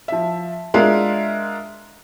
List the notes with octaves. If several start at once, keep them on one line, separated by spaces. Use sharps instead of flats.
F3 E5
G#3 D4 F4 A#4 E5 F5